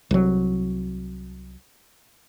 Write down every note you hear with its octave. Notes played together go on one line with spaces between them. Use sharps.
C2 F#3